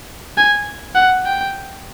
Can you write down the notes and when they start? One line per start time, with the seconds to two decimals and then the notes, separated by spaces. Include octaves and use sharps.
0.37 G#5
0.95 F#5
1.26 G5